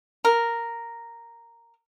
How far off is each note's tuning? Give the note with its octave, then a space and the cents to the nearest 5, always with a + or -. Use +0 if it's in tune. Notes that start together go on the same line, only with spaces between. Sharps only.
A#4 -5